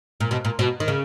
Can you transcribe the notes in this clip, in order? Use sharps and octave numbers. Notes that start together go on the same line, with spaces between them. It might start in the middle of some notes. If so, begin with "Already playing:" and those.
A#2
B2
A#2
B2
D#3
C#3